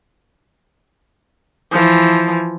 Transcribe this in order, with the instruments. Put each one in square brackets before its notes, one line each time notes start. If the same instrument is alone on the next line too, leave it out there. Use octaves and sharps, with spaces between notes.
[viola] E3 F3